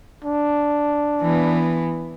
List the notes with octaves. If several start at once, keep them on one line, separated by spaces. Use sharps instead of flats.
D4
E3 B3